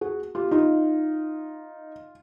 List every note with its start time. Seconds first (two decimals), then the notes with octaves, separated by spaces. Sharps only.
0.01 F#4 G#4
0.35 F4 G4
0.51 D#4 F4